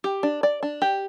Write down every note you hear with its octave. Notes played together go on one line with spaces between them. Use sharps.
G4
D4
D5
D4
G4